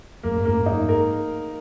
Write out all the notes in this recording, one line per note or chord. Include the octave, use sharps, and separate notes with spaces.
F#2 A#3
G#2
F#2 A#3
G#2
D#4
F#2
G#2 A#4